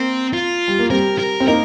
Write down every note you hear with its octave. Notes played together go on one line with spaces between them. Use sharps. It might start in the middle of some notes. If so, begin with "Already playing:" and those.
Already playing: A#3 C4
F4
G3
A#3
G3 C4 A#4
A#4
C4
A#3 D#4 A#4